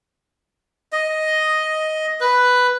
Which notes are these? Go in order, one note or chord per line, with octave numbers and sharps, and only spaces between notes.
D#5
B4